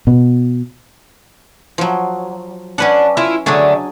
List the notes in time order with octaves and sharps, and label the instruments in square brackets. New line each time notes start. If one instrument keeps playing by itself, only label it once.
[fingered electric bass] B2
[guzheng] F3 F#3
[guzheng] C#4 B4 F#5 [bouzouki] D4
[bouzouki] E4 F4
[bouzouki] D3 A3 [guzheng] F#3 D4 G#4